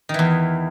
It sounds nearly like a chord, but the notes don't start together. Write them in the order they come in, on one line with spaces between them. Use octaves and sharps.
D#3 E3 E2